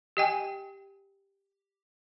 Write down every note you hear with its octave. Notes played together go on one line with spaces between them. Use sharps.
G4 D#5 G5 G#5